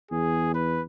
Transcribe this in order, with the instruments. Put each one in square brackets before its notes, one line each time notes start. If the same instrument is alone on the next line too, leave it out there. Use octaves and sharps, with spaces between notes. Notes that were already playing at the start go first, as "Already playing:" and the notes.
[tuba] E2 [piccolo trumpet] G#4
[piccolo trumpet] B4